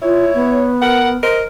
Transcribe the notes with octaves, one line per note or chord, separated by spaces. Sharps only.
E4 F4 C#5
B3
A#4 F#5
A#4 C5 D#5